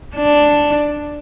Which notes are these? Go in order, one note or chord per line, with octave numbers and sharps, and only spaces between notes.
D4